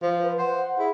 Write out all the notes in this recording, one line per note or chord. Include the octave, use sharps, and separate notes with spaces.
F3 C5
B4
C5 F#5
E4 G#4